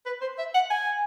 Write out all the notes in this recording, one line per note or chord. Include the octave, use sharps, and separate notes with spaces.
B4
C5
E5
F#5
G#5